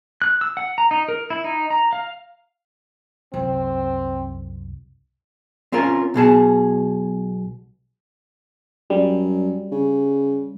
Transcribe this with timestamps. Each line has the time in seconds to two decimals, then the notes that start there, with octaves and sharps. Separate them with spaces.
0.22 F#6
0.41 E6
0.57 F#5
0.78 A#5
0.91 D#4
1.08 A#4
1.30 E4
1.44 D#4
1.70 A#5
1.93 F5
3.34 C2 F#2 C4
5.72 C4 C#4 F4 A#4
6.14 B1 B2 G#4 A5
8.90 F#2 G3
9.72 C#3